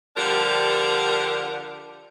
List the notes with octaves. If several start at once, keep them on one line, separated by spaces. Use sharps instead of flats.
D3 F3 G3 D4 G4 A#4